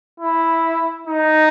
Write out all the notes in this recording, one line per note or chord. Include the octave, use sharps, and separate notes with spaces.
E4
D#4